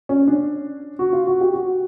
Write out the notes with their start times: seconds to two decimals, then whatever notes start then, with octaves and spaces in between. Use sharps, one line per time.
0.09 C#4
0.28 D4
0.99 F#4
1.13 F4
1.27 F#4
1.41 G4
1.54 F#4